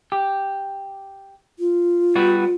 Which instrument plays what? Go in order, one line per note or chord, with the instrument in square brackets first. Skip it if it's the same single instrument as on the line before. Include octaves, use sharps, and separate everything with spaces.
[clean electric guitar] G4
[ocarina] F4
[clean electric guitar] G3 B3 F#4